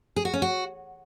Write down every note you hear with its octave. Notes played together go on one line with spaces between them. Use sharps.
G#4
F#4
C#4
F#4